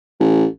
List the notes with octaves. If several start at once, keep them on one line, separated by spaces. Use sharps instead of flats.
A1